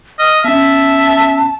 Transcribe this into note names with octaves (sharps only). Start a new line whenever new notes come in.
D#5 F6
B3 C#4 E5 A5